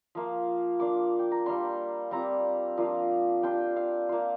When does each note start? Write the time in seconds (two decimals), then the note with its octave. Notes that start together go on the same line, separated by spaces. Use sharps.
0.15 F3 A#3 F4
0.80 A#3 D4 F4 D6
1.19 G5
1.32 A#5
1.46 G3 A#3 D4 C6
2.11 G3 C4 F4 A#5
2.77 F3 A#3 D4 F4
3.43 G3 D4 F4 G5
3.76 F5
4.09 A#3 F4